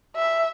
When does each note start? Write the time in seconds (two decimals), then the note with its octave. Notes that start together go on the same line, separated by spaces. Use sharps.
0.16 E5